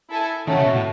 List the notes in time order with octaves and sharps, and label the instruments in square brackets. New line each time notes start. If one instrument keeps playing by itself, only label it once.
[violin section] E4 A4 E5 G#5
[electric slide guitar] D#3 [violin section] A3 C#4 F#4
[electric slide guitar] C#3
B2
A2